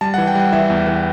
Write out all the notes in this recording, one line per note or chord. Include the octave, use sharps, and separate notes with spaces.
G3 A5
F#5
E3
G5
G3 F#5
E3 E5
E2
E3